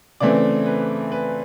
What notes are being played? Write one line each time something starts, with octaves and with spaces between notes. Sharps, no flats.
C#3 E3 A3 C4 D5
B4
B4